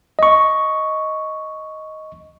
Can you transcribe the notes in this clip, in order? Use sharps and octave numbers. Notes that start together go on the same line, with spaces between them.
D#5 C#6